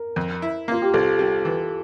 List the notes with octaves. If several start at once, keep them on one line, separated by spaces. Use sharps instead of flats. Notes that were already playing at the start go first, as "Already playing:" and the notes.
Already playing: A#4
F2
E4
A#3 F4
G4
C2 A4
G3
E3